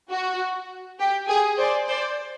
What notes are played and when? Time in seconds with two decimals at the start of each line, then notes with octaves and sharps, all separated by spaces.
0.11 F#4
1.00 G4
1.29 G#4
1.59 C5 D5
1.88 C5 D5